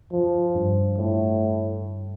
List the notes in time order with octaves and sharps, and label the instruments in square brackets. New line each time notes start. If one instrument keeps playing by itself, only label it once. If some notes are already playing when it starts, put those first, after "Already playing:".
[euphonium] F3
[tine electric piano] G2
[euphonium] A2